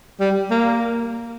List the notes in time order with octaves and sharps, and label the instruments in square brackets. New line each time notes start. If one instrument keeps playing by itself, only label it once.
[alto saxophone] G3
A#3